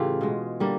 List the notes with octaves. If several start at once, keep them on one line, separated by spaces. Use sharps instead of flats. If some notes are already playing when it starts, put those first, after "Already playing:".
Already playing: A2 C#3 E3 A3 F4 G4
B2 G#3
D3 G3 A#3